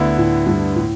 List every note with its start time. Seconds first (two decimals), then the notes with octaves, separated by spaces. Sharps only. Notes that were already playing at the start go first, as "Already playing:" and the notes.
Already playing: D2 D3 B3 E4
0.18 A2
0.46 G2
0.76 A2